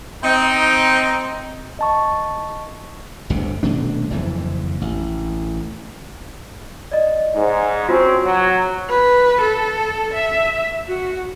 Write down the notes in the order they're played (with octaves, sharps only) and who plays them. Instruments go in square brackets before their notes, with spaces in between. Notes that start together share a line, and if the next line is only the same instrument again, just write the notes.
[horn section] C4 D#4
[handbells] D#5 A5 C#6
[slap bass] G1 D2 C3
D#1 B2 A3 D4
F#1 F2 G#2 E3
A1
[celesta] D5 D#5
[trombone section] G#2
[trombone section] C4 C#4 [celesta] F4 F#4
[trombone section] F#3
[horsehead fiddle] B4
A4
E5
F#4